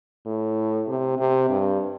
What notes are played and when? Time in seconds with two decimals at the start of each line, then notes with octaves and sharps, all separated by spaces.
0.26 A2
0.88 C3
1.19 C3
1.50 G2